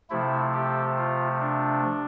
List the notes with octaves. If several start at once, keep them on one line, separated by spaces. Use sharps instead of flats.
C3 F3 A3 E4
G4
F4
D4